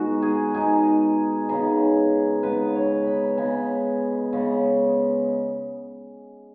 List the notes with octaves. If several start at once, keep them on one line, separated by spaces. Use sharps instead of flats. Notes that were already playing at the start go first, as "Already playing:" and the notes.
Already playing: B2 G#3 D#4 F#4
G#4
B2 G#3 D#4 G#4
C#3 G#3 B3 D#4 G#4
C#3 G#3 B3 D#4 B4
C#5
B5
C#3 G#3 B3 G#5
C#3 G#3 B3